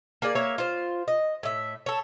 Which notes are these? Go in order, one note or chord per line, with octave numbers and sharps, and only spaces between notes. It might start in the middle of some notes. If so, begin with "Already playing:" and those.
A#3 G#4 D5
A#3 C#5 E5
F4 C5
D#5
A2 E5
A4 C#5